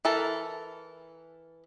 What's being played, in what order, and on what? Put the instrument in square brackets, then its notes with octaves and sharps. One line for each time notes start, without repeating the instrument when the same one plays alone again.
[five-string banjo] E3 A4 A#4